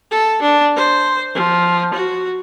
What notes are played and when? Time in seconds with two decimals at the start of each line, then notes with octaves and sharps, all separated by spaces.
0.11 A4
0.42 D4
0.75 C5
1.34 F3
1.94 F#4